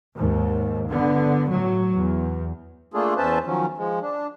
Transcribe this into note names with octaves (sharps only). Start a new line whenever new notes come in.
D#2 G#2
G1 D3 B3
A2 F#3
E2
A3 A#3 D4 F4 G#4 A4
E2 C#4 B4 C5 E5 A5
D#3 F3 F#3 C#4
F3 G#3
D4